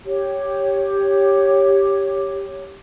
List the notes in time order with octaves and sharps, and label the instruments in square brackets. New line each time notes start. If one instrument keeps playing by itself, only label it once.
[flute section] G4 C#5